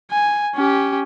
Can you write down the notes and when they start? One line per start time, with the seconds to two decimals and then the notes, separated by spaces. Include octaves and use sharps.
0.11 G#5
0.55 C#4 G4